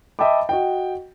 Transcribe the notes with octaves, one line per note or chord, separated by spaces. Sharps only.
D#5 E5 G5 A5 B5 D6
F#4 D#5 G5